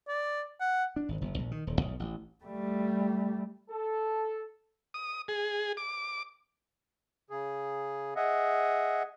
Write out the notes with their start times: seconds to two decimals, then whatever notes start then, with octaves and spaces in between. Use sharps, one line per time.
0.08 D5
0.61 F#5
0.96 D4
1.09 G#1
1.21 F#1
1.39 A#1
1.51 D#3
1.67 D#1
1.81 B1
2.00 A1
2.44 G3 A3
3.71 A4
4.94 D#6
5.28 G#4
5.77 D6
7.30 C#3 G#4
8.16 G#4 D#5 E5 F#5